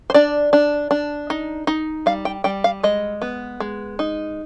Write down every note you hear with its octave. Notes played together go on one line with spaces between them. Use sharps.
C5
D4 D5
D4
D4
D#4
D#4
G3 F5
G5
G3 G5
F5
G#3 D#5
B3
G#3
D#4